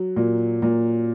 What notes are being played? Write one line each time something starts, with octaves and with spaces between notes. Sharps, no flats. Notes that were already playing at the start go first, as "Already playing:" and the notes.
Already playing: F#3
A#2
A#2